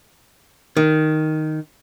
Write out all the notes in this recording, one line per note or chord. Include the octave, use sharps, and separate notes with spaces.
D#3